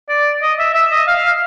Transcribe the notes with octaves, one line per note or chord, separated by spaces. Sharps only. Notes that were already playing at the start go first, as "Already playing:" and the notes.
D5
D#5
E5
E5
D#5
F5